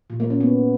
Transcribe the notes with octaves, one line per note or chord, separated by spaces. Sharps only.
A#2
A#3
C#4
B3